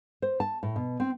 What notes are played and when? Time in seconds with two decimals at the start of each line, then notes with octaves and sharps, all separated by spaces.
0.22 C5
0.40 A5
0.63 A2
0.76 B2
1.00 C4